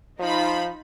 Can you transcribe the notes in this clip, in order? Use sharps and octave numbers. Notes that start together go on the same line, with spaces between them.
F3 D#4 F4 B5